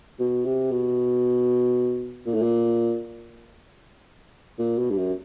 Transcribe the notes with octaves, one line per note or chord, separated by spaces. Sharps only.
B2
C3
B2
A#2
A2
A#2
A#2
B2
G2
F#2